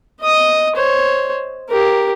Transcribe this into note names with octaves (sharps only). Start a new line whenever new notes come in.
D#5 D#6
C5 C#5
G4 A#4